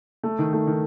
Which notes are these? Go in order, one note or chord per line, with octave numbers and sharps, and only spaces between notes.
A3
D#3
A3
D#3